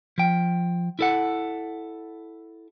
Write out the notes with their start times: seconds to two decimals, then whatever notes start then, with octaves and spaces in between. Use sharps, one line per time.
0.18 F3 G5
0.99 E4 A4 F#5